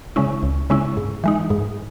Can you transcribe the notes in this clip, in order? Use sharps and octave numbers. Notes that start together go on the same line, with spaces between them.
C#3 G#3 C#4 E4
C#2
C#3 G#3 C#4 E4
G#2
E3 G#3 D#4
G#2